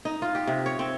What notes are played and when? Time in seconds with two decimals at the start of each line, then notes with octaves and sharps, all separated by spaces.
0.05 D#4
0.22 F4
0.35 G4
0.47 C3
0.66 C#5
0.79 C4